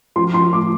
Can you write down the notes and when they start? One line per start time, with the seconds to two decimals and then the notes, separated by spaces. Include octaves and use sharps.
0.16 F3 C6
0.34 F3 C6
0.53 A2 D6